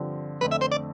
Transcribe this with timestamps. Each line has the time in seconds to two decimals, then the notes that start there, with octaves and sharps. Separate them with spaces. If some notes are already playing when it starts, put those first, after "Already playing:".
Already playing: G2 D3 F3 C4
0.41 F2 D3 A3 C4 B4
0.51 E5
0.61 C5
0.72 D5